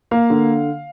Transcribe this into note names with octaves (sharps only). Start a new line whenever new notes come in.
A#3 F5
D3